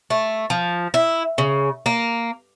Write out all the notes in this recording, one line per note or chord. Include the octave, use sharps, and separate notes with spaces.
A3
F3
E4
C#3
A#3